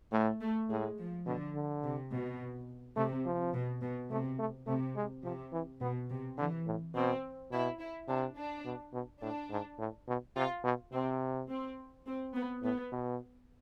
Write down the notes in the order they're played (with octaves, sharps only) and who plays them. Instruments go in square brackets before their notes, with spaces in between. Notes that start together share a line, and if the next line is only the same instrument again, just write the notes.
[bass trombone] A2 [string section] A3
[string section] A3
[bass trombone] A2 [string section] G#3
[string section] F3
[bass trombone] B2 [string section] D3
[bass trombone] D3
[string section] C3
B2
[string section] C3 [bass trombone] A3
[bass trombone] F3
[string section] B2
B2
[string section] C3 [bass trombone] A3
[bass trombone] A3
[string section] C3 [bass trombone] A3
[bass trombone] G#3
[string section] C3 [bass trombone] F3
[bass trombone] E3
[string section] B2 [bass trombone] B3
[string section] C3
[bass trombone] D3 [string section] E3
[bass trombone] A2
[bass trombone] B2 [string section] C4
[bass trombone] B2 [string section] E4
[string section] E4
[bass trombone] C3 [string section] D4
[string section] D4
[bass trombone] B2
B2
[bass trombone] A2 [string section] D4
[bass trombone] G#2
A2
B2
[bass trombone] C3 [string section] F4
[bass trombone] B2
[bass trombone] C3 [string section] C4
[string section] C4
C4
B3
[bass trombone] A2 [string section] B3
[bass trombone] B2